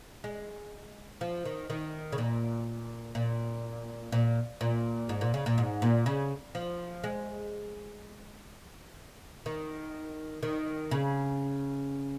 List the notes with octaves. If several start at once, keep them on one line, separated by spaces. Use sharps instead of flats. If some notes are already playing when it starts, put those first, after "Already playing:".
G#3
F3
D#3
D#3
C#3
A#2
A#2
A#2
A#2
G#2
A#2
C#3
A#2
G#2
A#2
C#3
F3
G#3
D#3
D#3
C#3